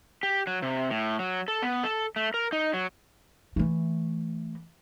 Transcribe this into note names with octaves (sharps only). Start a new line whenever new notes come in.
G4
F#3
C3
A2
F#3
A4
B3
A4
A3
A#4
D#4
F#3
E3 A3